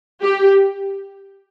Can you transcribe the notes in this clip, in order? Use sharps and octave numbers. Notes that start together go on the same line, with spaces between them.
G4